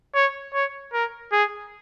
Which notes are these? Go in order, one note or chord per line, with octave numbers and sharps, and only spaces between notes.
C#5
C#5
A#4
G#4